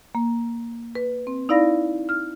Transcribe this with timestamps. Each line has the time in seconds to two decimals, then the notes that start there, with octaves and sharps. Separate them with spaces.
0.15 A#3
0.95 B4
1.27 C4
1.49 D#4 E4 D5 F5 B5 A#6
2.09 F6